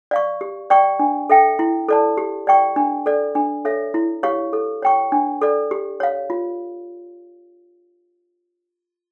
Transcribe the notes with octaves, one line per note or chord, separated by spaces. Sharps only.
D5 F5 C#6
G4
D5 G5 C#6
D4
A4 E5 G5
E4
A4 D5 A5
G4
D5 G5 C#6
D4
A4 D5
D4
A4 C#5 E5
E4
G4 C#5 F5 C#6
A4
C#5 G5 C#6
D4
A4 D5
G4
C#5 F5
F4